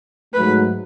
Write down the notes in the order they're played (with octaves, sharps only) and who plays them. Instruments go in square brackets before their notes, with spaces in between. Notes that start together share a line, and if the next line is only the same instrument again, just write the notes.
[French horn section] G#2 F#3 A3 [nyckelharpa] B4